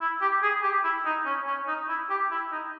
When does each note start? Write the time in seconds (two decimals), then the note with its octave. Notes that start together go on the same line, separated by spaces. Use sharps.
0.01 E4
0.21 G4
0.42 G#4
0.63 G4
0.84 E4
1.05 D#4
1.26 C#4
1.47 C#4
1.68 D#4
1.89 E4
2.10 G4
2.31 E4
2.52 D#4